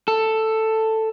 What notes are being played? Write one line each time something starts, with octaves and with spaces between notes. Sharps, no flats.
A4